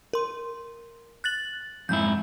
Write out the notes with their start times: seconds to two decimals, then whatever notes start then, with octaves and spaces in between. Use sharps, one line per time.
0.13 A#4 C6
1.24 F#6 A6 F#7
1.89 F2 G#2 E4 G6